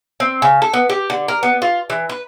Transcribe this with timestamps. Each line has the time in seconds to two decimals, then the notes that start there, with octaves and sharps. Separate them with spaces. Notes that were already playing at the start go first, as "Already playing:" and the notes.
0.20 C4
0.42 C#3
0.62 A4
0.74 B3
0.89 G4
1.10 D3
1.28 A#4
1.43 B3
1.62 F4
1.90 E3
2.09 B4